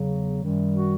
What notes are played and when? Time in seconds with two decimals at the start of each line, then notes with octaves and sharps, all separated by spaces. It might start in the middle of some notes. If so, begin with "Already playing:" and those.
Already playing: E2 C#3 F#3
0.41 F#2 D#3 G3
0.75 F#4